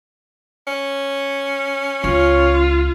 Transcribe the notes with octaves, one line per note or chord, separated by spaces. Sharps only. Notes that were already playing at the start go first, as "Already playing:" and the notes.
C#4
C#2 F4 C#5